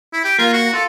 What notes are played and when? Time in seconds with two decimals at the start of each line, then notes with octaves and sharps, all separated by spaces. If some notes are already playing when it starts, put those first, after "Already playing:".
0.13 E4
0.24 G4
0.39 A#3 F4
0.53 F#4
0.73 F4 A4